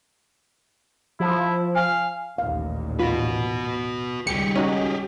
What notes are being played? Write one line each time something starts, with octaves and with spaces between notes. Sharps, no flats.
F3 E4
F5 G#5
A1 D#2 A#2 F5
F4 F#4 B4
C#2 D#3 G3 G4 G#4 C#7
C#4 D#4 F#4